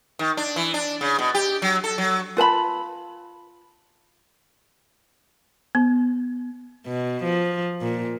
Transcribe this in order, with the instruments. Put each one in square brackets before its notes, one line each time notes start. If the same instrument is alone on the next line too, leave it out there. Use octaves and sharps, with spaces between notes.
[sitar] D#3
D4
E3
D4
C#3
B2
G4
F#3
A4
F#3
[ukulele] F4 B4 A5 B5
[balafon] B3
[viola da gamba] B2
F3
A#2